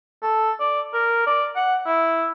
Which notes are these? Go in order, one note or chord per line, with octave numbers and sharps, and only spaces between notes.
A4
D5
A#4
D5
F#5
E4